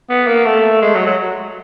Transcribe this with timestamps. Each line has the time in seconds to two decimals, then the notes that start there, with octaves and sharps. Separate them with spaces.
0.09 B3
0.27 A#3
0.45 A3
0.82 G#3
0.95 F#3
1.06 F#3